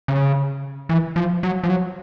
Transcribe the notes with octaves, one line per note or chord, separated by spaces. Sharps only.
C#3
E3
F3
F#3
F3
F#3